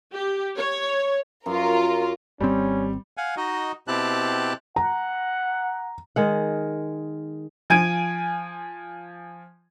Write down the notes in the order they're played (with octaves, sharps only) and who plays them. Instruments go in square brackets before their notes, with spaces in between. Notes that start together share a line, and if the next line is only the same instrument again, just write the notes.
[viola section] G4
C#5
[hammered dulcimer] F#2 [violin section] F4 A#4
[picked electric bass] G#1 C4 [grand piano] G3 [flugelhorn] C#4
[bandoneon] F5 F#5 G#5
D#4 F#4 D#5
B2 C4 E4 G4 A5 F#6
[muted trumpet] F#5 [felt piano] A#5
[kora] D#3 G#3 F#5
[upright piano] F3 G#5 G#6 D7 D#7